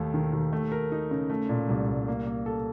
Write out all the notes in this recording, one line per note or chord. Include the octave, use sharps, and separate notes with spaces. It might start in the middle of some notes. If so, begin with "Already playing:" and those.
Already playing: D#2 D#3 A3
D#3
D#2
A3
A#4
D#4
C#3
A3
A#2
C2
C2
A#3
A#3
A4